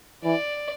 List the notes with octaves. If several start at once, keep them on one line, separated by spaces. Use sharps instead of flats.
E3 D5